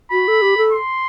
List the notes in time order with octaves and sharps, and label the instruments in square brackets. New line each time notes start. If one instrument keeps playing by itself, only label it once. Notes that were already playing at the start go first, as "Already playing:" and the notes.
[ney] F#4 [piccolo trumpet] B5
[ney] A4
G4
A4
[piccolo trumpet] C6